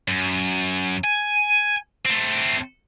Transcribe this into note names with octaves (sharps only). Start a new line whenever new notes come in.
F#2
G#5
A3 C4